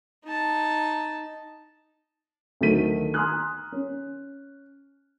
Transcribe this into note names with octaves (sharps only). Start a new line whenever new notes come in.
D#4 A5
D2 D#3 F#3 A3 B6 D#7
G#5 A#5 C6 D#6 F6 F#6
C#4